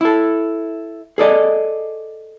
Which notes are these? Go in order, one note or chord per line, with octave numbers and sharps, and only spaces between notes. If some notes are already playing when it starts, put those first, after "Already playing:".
E4 A4
G#4 A4 D5 D#5